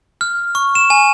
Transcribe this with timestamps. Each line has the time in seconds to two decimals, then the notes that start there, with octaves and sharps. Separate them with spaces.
0.21 F6
0.55 C#6
0.75 E7
0.90 G#5